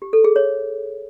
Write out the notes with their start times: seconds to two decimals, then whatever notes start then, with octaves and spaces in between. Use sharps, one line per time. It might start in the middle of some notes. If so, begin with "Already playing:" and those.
0.02 G4
0.13 A4
0.24 G#4
0.36 C#5